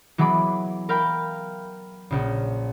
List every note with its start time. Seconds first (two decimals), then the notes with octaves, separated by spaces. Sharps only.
0.18 E3 F#3 B3 G#4 B5 D6
0.89 A#4 F5 G5 B5
2.11 A#1 C#3